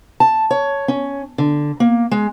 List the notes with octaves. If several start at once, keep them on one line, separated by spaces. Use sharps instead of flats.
A5
C#5
C#4
D3
A#3
G#3